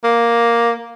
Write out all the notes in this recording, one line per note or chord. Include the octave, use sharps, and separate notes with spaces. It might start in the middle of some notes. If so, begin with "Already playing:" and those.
A#3